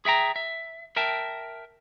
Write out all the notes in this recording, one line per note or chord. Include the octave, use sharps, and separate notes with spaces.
G#4 E5 G5 A#5
E5
A#4 E5 G5 A5